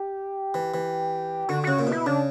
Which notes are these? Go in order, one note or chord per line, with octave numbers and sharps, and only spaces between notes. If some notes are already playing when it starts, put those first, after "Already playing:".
Already playing: G4
E3
E3
D3 F#4
C#3 F#4
A#2
B2 E4
C#3 D4